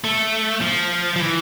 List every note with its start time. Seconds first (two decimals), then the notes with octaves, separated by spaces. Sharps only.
0.04 A3
0.62 F3
1.16 F3
1.20 E3